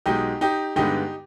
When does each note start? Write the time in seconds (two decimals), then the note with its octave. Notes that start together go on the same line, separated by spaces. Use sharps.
0.06 B1 B2 G#3 D#4 G4
0.41 D#4 G4
0.76 G2 D3 G#3 B3 D#4 G4